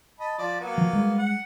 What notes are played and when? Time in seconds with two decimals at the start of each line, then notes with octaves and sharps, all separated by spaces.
0.20 D#5 A5 B5
0.38 F3 D5
0.60 F#3 A#3 B3
0.78 F3
0.93 G3 G#3
1.18 F#5